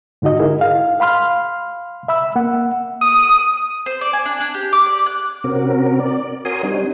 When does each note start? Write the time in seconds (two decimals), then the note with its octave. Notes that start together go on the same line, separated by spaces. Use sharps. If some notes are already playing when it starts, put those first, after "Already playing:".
0.22 G#2 D3 D#4 F#4 D#5
0.40 E4 G#4 A#4
0.61 F5
1.00 F5 B5 C6 F6
2.08 E5 B5 E6
2.36 A#3 F#5
3.01 D#6
3.86 C5
4.01 D5
4.13 G#5
4.25 D4
4.40 D4
4.54 G4
4.73 D6
4.86 D5
5.06 F#6
5.44 C3 C4 C#4 F#4 A#4
6.00 D5
6.45 F#4 A#4 C#5 G#5 C6 D#6
6.63 G3 C4 D4 D#4